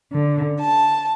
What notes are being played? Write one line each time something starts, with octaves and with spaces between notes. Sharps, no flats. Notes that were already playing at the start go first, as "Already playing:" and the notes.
D3
A5